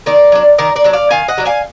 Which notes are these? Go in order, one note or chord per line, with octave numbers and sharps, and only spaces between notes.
D#3 A#4 D5
F#3 D4
D#3 A#4 D5
A#4 D5
F#3 D4
D5 F5
D#3 F5 G#5
D#5 F#5
F#3 D4
F5 G#5